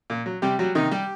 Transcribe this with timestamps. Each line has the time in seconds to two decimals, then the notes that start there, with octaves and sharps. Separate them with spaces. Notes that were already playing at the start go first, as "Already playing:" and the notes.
0.10 A#2
0.26 F#3
0.42 C3 G3 G4
0.59 F#3 G3 F#4
0.75 C3 D#3 D#4
0.91 G3 G4